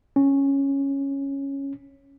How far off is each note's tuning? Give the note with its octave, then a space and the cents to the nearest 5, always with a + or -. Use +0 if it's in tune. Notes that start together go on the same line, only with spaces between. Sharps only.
C#4 -5